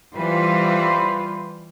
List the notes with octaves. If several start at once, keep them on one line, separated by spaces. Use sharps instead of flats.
E3 G3 F4 B4 C5